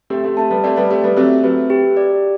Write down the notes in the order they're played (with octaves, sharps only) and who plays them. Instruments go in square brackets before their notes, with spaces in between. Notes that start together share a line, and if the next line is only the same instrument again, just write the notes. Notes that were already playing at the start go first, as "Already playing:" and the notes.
[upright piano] A3 C4 [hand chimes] G4
[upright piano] A3 C4
[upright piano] A3 C4 [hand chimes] A5
[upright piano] G3 B3
[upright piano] A3 C4 [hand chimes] D5
[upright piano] G3 B3
[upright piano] A3 C4 [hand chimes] G4
[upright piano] G3 B3
[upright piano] F#3 A3 [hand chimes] C4
[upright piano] F#3 A3 [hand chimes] B4
[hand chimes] G4
D5